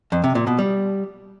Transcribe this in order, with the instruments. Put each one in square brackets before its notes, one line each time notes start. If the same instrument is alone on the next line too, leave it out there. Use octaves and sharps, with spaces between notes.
[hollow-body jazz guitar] F2
C3
A#2
B2
G3